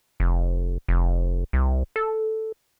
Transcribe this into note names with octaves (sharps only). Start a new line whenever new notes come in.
F1
F1
C2
A4